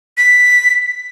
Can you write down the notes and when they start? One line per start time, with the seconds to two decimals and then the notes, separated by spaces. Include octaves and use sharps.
0.17 B6